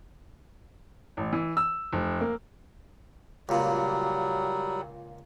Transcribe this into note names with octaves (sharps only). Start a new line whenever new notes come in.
A1
E3
E6
F1
A#3
C#2 A#2 F#3 G3